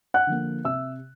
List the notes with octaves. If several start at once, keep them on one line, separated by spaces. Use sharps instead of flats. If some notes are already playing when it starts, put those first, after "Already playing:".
F#5 F#6
D3 F3 A#3
C3 E5 E6